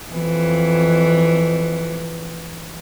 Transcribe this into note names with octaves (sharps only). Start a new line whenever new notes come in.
F2 E3